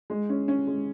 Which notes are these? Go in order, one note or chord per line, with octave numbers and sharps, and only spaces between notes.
G#3
C#4
C#4
G#3